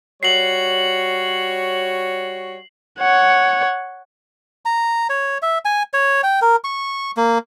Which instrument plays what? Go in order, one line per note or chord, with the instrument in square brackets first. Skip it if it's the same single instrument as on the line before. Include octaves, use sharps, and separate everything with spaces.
[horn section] G3 F#4 C#5 [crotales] C7 F#7
[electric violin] C#5 F#5
[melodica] A#5
C#5
E5
G#5
C#5
G5
A#4
C#6
A#3